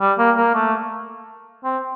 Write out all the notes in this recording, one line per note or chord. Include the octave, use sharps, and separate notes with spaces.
G3
A#3
A#3
A3
C4